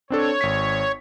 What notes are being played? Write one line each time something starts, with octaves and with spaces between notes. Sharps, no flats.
C4 D4 A4 C#5
G#1 B6